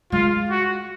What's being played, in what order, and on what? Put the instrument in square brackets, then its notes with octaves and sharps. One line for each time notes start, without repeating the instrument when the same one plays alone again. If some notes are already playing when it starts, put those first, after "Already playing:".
[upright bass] G#3 [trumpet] F4
[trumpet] F#4